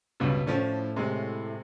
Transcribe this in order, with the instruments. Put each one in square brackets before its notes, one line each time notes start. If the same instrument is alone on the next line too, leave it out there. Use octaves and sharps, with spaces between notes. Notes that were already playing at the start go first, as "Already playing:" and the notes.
[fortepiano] C#2 G2 B2
[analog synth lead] A2 [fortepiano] F3 C#4 D4
[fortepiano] C3 G#3